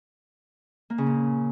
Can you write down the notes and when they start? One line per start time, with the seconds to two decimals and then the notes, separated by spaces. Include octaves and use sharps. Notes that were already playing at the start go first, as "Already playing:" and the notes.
0.90 A#3
0.98 C#3
1.06 A#2